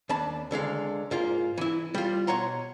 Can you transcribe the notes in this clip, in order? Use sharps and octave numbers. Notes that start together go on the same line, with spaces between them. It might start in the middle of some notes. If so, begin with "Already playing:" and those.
D#2 D4 A5 B5
C#2 D3 G#3 F5
G#2 A#3 F4
E3 E4
G3 F4
B2 C#5 F#5 A#5 C6